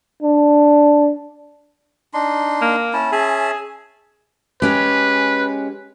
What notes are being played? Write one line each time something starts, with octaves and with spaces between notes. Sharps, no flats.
D4
D4 D#4 C6
A#3
C#4 E4 A5
C#4 G#4 E5 A5
G#3 C#4 G4 B4